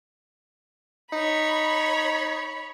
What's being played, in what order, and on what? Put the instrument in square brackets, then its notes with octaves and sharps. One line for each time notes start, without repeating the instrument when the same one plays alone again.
[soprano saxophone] D#4 [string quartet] C#5 B5